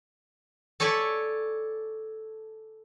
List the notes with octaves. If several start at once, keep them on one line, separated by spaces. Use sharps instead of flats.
A4 C#5 D5 G#5 B5